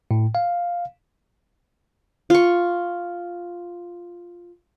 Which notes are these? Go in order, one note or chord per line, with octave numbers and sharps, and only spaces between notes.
A2
F5
F4 C#6